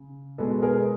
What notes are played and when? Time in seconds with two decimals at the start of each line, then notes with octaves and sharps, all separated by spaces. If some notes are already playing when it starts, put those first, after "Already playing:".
Already playing: C#3
0.38 B2 G#3 B3 A4 B4
0.62 G#4 A#4